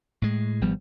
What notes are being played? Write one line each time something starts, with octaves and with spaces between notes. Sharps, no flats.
A2 G#3
G#1 F3 G3 B3